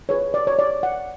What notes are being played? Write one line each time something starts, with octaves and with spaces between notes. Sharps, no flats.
F4 G#4 B4 C#5
D5
C#5
D5
F#5